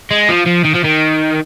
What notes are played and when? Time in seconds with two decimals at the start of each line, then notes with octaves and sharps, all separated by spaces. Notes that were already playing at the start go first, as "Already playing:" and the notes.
0.11 G#3
0.29 F3
0.47 F3
0.65 D#3
0.75 F3
0.85 D#3